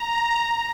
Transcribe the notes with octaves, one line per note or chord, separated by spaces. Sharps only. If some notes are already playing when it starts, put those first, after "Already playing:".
Already playing: A#5